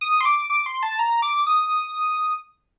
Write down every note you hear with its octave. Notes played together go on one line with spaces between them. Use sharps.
D#6
C6
D6
D6
C6
A5
A#5
D6
D#6